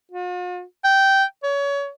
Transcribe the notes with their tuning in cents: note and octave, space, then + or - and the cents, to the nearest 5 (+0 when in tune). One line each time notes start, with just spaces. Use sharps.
F4 +45
G5 -10
C#5 +30